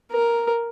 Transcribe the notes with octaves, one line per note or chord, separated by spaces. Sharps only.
A#4